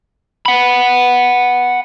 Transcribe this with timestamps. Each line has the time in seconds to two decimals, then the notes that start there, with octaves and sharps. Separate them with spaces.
0.46 F#5 B5